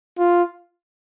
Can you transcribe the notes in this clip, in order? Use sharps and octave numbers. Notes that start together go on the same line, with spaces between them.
F4